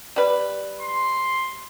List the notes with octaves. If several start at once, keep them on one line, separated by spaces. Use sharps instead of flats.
G3 B4
C6